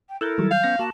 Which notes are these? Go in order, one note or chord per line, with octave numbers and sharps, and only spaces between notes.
G5
E4 A4 A#4 E6 F#6 G6
D#3 F#3 G3
F5 G6
B3 C#4 A#6
A#3 F#4 A5